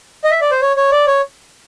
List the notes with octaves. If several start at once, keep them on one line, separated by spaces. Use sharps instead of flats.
D#5
E5
D5
C5
C#5
C#5
D5
C#5